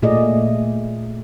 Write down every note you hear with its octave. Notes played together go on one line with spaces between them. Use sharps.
A#2 A3 G#4 D5 D#5